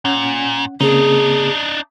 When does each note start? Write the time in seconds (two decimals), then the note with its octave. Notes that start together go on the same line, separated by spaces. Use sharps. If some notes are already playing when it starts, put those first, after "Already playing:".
0.05 A#2 C#4 F#5
0.81 C#3 A#3 C4 D4 D#4 G#4